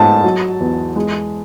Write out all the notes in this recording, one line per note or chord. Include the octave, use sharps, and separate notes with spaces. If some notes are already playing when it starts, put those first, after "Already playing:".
Already playing: G#2 A3 A5
F#3
E2
G#3